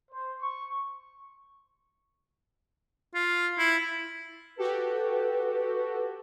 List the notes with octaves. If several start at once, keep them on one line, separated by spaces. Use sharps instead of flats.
C5
C#6
F4
E4
F#4 G4 A4 B4